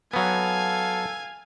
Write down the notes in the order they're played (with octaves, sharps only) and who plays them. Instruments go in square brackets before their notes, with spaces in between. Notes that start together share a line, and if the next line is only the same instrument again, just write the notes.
[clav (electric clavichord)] F#3 B3 [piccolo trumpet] A4 [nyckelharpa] F5 [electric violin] G#5